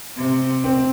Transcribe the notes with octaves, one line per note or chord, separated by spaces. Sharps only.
C3
C4